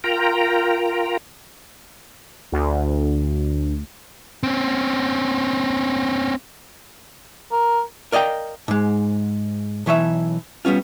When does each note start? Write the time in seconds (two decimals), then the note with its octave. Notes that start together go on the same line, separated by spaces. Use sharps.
0.04 F4 A#4 G5 A#5
2.52 D2
4.43 C4 C#4
7.52 A#4
8.12 A#4 D5 D#5 F5 G5
8.68 G#2 G#3
9.86 B1 E3 C#5 D#5 E5
10.65 G3 B3 C#4 F4